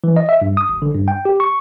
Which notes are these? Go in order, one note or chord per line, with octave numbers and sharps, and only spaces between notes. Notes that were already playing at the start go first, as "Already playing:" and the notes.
E3
D#5
E5
G2
D#6
G#1
D3
G2
G5
G4
C#6